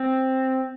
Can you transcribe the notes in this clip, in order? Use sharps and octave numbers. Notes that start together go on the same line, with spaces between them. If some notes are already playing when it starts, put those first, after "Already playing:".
Already playing: C4